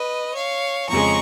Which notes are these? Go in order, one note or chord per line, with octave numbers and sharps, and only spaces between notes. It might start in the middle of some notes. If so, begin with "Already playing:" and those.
Already playing: B4 D#5
C#5 F5
F2 C#3 G#3 A#5 C#6